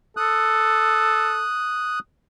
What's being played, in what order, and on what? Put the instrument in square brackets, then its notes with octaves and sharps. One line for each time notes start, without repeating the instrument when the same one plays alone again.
[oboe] A4 [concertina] D#6 F#6